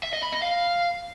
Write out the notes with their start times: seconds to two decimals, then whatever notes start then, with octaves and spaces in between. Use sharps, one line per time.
0.03 E5
0.13 D#5
0.23 B5
0.32 D#5
0.42 F5